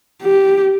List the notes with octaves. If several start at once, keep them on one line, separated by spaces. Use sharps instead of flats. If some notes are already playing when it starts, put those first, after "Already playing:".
G4